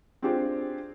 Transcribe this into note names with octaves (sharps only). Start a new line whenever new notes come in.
C4 D4 F4 G4 G#4 C5